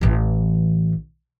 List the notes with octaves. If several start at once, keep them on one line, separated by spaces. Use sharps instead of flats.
A1 E3